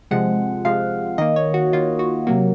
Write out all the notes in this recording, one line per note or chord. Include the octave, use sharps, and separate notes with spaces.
C3 F3 G#3 F#5
C3 F3 G#3 F5
D#3 A#3 D#5
C#5
F#4
D#3 A#3 F4
F#4
C3 F#3 A#3 F#4